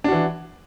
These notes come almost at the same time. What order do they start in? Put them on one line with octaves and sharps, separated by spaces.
D4 F#4 E3